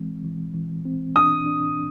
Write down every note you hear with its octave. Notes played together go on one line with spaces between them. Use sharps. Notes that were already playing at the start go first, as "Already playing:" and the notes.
Already playing: E3 G#3 C4
E3
E3
C4
D4 D#6
D4